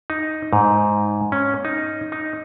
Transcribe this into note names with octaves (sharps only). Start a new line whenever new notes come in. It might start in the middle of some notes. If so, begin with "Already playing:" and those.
D#4
G#2
C#4
D#4
D#4